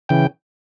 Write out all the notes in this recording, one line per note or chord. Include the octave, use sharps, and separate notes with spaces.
C#3 E3 G5